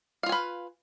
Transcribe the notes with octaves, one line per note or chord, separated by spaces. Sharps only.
F4 B4 F5 G#5